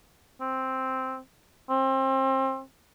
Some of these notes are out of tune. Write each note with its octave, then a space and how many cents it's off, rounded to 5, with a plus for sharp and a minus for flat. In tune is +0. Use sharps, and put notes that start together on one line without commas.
C4 +0
C4 +30